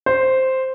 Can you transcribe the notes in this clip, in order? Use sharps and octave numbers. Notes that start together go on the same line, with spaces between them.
C5